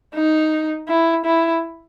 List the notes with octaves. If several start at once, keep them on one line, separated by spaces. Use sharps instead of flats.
D#4
E4
E4